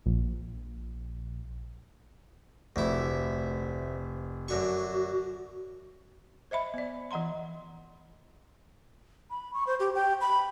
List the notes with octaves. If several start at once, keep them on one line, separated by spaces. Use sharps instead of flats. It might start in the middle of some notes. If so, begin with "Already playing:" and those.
A#1
F1 D2 E4
F#2 D3 F#4 C#6
C5 D#5 E5 B5
B3 D5
E3 D#5 F#5 A#5 C6
B5
C#6
C5
G4
G5
B5